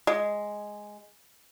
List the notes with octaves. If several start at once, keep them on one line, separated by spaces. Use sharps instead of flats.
G#3